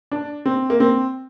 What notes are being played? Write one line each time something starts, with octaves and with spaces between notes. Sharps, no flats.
D4
C4
A#3
C4